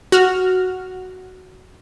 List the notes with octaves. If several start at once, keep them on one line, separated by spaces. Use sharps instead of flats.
F#4 F6